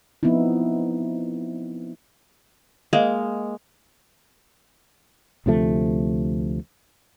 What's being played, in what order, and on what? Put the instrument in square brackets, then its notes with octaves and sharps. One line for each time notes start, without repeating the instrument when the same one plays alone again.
[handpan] F3 B3 C4 D#4 E4
[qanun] G#3 A#3 [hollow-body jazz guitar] D#5 F5
[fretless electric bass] D2 C3 F3 A3